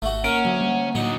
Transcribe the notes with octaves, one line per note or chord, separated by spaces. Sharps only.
G#1 A3 F#4
A#3 C#4 A#4 F#5
D2 F#3
G3
A2 D3 F#3 D#4